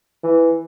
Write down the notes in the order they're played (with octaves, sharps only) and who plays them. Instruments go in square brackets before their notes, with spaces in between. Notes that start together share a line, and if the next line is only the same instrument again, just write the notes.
[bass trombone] E3